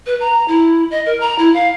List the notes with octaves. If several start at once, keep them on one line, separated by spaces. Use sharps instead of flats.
B4
A#5
E4
D#5
A#4
A#5
E4
F5